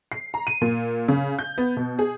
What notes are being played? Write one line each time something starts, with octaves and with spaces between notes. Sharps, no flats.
C7
A#5
D#7
A#2
C#3
G6
B3
B2
G#4